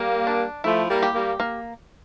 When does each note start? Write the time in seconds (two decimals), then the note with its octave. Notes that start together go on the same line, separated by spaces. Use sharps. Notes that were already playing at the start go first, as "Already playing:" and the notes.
Already playing: G3 A#3
0.27 D4
0.64 F3 A3 E4
0.89 G3 A#3
1.03 G4
1.14 G3 A#3
1.40 A#3